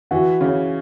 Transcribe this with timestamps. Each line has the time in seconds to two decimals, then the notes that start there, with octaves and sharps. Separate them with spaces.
0.11 E3 F#4
0.41 C#3